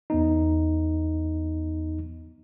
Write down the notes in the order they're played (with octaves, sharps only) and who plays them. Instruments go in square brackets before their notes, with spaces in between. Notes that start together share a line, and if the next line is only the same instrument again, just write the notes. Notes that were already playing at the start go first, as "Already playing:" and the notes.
[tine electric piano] E2 B3 D#4